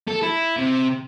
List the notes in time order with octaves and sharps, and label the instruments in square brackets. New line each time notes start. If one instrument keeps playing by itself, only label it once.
[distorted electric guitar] A4
E4
C3